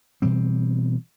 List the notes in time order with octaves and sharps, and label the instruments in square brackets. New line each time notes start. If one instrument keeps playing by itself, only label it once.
[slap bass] B2 E3 G3 C4